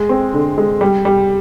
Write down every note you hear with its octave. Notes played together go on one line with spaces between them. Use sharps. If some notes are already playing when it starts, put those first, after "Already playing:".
Already playing: G#3
C4
D3
G#3
G3
G3